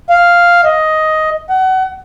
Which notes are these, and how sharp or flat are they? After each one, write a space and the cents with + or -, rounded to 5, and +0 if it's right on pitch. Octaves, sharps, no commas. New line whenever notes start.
F5 +0
D#5 +10
F#5 +30